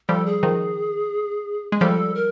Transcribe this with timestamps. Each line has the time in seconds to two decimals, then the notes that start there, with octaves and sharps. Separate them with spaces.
0.08 F3 G3 A4
0.26 G#4
0.43 D#3 F3
1.72 G#3
1.80 F3 G3 A4
2.15 A#4